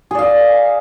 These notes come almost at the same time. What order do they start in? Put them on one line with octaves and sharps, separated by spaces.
G#4 D5 F5